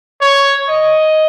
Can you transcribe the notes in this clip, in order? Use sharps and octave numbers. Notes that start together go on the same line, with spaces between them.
C#5
D#5